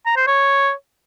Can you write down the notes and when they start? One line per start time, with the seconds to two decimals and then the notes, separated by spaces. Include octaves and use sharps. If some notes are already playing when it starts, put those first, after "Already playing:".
0.06 A#5
0.16 C5
0.27 C#5